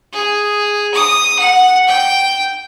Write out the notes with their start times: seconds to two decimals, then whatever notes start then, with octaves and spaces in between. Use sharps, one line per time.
0.13 G#4
0.94 D#6
1.39 F#5
1.88 G5